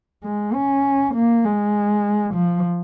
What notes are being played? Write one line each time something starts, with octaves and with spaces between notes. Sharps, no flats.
G#3
C#4
A#3
G#3
F3